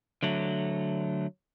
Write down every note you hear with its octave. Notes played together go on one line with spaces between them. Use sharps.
D3 F#3 A3